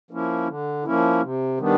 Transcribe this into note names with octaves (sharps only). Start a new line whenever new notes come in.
F3 A#3 C#4 E4
D3
F3 A#3 C#4 E4
C3
D#3 G3 B3 D4